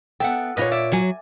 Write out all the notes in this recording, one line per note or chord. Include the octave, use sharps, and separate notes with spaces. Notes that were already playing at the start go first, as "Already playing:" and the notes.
B3 A4 E5 F#5 G5
A#2 F4 B4 C#5 D#5
D5 E5
F#3 G#5